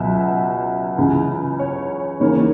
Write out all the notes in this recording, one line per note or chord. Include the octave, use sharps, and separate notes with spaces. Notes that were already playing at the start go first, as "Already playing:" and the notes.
Already playing: C#2 B2 F#3 E5
C#2 C#3 E3
C#5
D#2 C#3 E3 A#3 C#5